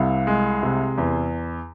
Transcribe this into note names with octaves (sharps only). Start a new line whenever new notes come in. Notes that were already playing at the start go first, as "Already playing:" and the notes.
Already playing: C2 C3 F5
G#3
C3
E2